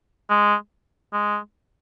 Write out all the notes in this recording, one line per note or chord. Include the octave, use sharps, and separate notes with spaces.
G#3
G#3